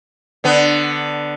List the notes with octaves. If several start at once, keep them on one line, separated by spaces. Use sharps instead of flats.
D3 B3